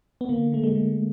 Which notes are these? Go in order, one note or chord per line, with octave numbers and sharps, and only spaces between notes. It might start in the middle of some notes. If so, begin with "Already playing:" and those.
B3
D3 A#3
D3 A3
G#3
D3